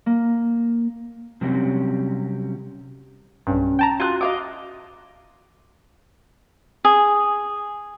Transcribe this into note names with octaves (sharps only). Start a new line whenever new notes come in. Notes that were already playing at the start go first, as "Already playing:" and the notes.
A#3
C3 F#3 G3 C4 C#4
B1 G2 C#4
G5 A5 A#5
F4 F#4 F#6
D#5 F5 D6
G#4